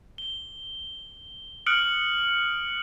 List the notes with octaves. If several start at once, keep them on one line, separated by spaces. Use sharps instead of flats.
G7
D#6 F6 F#6 C#7 D7 F#7